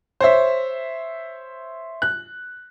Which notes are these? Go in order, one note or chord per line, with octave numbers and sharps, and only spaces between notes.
C5 C#5 E5
F#6